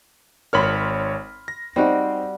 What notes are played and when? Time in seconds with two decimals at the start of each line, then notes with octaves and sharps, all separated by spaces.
0.53 G#1 A#4 C#5 B5 C6 F6
1.48 A#6
1.76 G3 C4 D#4 F#4